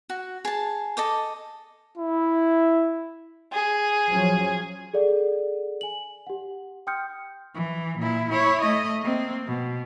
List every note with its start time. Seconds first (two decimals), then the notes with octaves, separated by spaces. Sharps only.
0.10 F#4
0.45 G#4 A5
0.97 A4 D#5 D6
1.98 E4
3.53 G#4
4.09 F3 F#3 C#4
4.94 G#4 A4 D5 F#5
5.81 G#5 F#7
6.27 G4 F#5
6.87 G5 C6 D#6 F6 G6 C#7
7.55 E3
7.99 A#2 E4
8.30 E4 C#5
8.62 A3 D#5
9.01 A#3 C4
9.47 B2